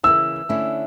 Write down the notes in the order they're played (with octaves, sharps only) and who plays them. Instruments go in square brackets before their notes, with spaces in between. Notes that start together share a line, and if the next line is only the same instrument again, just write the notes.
[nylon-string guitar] C#3 E3 A#3 E4 [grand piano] E6
[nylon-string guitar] D3 A3 C#4 E4